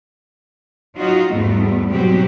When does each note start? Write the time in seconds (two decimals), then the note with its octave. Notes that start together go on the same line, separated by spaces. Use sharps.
0.96 F#3 D#4 F4 F#4
1.32 E2 G#2 G3 A3 B3
1.91 G#2 B2 F#3 C4 F#4 G4